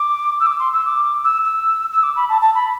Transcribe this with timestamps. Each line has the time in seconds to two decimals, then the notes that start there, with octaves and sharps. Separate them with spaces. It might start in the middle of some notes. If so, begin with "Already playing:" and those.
Already playing: D6
0.40 E6
0.46 D6
0.60 C6
0.73 E6
0.86 D6
1.24 E6
1.45 E6
1.92 E6
2.03 D6
2.16 B5
2.29 A5
2.42 A5
2.55 B5